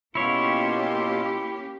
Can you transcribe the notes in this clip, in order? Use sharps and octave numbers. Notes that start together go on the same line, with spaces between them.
B2 A#3 C#4 E4 F4 G4 C#5 C6